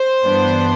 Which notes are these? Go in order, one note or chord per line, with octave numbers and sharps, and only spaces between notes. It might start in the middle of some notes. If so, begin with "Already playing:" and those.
Already playing: C5
G2 E3 B3 D4